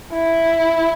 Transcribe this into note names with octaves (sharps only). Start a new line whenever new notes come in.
E4